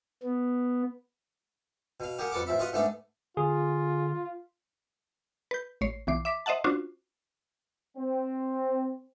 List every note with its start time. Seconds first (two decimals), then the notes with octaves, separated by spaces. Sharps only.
0.23 B3
2.00 B2 F5
2.19 G4 G#4 A#4 F#5
2.31 F2 B3 A4 F#5 D6
2.47 A1 F3 E5 B5
2.59 F4 F#4 B4 D#5
2.73 G#2 A3 B3 D4
3.37 D3 F4 G#4
5.51 B4 G6
5.81 A1 C#5 C7
6.07 B1 E3 D6 C7
6.25 E5 D6 B6
6.46 C5 D#5 E5 F#5 A5
6.64 C#4 D4 F4 F#4 C5
7.97 C4